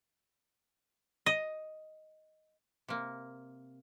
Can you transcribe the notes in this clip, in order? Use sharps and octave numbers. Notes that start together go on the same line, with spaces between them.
D#5
C3 A#3